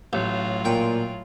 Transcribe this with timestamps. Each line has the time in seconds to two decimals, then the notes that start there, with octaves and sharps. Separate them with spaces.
0.13 A1 A2 F#3 F4
0.65 A#2 G5